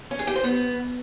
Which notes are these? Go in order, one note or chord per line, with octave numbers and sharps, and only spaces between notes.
C#4
G#4
G4
C5
B3